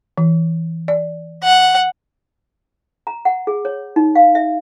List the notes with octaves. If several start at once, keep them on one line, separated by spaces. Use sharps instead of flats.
E3
D5
F#5
A#5
F#5
G#4
C#5
D#4
F5
E5